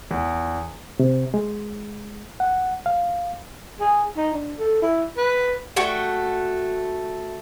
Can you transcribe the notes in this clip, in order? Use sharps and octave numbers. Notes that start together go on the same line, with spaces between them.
E2
C3
G#3
F#5
F5
G#4
D#4
D4
A4
E4
B4
A3 F#4 G5